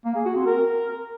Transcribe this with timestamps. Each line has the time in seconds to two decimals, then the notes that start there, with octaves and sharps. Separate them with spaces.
0.05 A#3
0.15 G#4
0.26 F#4
0.36 C4
0.46 A#4